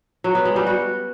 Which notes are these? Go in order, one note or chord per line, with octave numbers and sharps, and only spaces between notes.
F#3
B3
G#3
G3
F#4